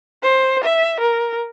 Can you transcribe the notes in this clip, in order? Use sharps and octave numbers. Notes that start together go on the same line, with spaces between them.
C5
E5
A#4